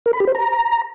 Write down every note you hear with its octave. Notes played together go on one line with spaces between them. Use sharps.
A#4
B5
G4
C5
A#5